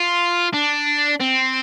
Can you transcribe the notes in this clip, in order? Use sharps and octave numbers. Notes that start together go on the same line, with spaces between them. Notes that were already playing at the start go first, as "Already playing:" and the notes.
Already playing: F4
D4
C4